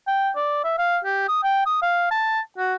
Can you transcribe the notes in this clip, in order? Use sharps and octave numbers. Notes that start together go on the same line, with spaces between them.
G5
D5
E5
F5
G4
D#6
G5
D#6
F5
A5
F#4